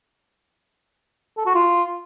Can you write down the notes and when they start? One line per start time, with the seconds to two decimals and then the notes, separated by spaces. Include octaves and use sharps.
1.37 A4
1.46 F#4
1.55 F4